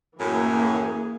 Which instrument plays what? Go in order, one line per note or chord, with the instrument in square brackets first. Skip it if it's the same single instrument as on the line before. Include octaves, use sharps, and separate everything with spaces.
[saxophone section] F#2 A2 [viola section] E3 A#3 G#4 [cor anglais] G#5